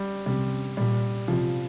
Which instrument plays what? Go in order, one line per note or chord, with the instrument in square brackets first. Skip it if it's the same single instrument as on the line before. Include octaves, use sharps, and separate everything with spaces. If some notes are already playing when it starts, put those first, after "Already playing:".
Already playing: [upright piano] G3
[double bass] C3 [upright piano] G3
[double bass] A#2 [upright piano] G3
[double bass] C3 [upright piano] F3